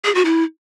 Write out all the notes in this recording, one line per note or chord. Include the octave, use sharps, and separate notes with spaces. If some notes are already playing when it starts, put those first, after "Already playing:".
G#4
F#4
E4